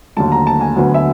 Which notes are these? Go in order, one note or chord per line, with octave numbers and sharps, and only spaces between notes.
D#2 D3 F#3 A3 A5
A#5
A5
G#5
D2 D3 F#3 B3
E5